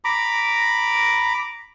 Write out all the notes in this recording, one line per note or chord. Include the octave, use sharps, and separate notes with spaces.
A#5 B5 D6